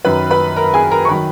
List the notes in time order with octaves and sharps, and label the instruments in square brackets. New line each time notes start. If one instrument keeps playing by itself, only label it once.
[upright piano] F#2 D#3 F#3 B4 B5
B4 B5
A#4 A#5
G#4 G#5
A#4 A#5
C#6
D#3 F#3 B4 B5